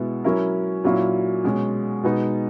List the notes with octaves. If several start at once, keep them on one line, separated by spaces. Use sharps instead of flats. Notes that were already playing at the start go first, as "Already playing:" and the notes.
Already playing: B2 G#3 B3 E4
F#3 C#4 E4 A#4
A#2 F#3 A#3 C#4 E4
B2 G#3 C#4
B2 G#3 B3 D#4